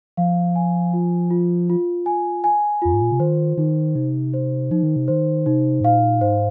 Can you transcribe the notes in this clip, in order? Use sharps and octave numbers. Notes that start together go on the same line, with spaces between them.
F3 F5
G#5
F4
F4
F4
G#5
G#5
F2 F4
G#2
A#2
C3
D#3 C5
D#3 D#4
C3 D#4
C5
F3 D#4
D#3
C3
D#3 C5
C3 D#4
G#2
A#2 F5
G#2 C5